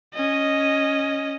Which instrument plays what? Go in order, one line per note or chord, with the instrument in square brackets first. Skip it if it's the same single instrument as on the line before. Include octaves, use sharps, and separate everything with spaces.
[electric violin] C#4 D#5